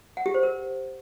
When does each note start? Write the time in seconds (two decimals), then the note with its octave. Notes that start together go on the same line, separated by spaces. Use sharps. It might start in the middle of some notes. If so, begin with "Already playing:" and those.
0.17 F#5
0.26 G4
0.34 C5
0.43 A#4